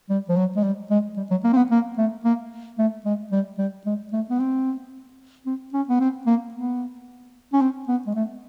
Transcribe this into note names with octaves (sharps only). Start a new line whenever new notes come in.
G3
F3
F#3
G#3
G3
G#3
G3
F#3
A#3
C4
B3
A#3
A3
A#3
A3
G#3
G3
G3
G#3
A3
B3
C4
C4
C#4
B3
C4
A#3
B3
C#4
C4
B3
G#3
A3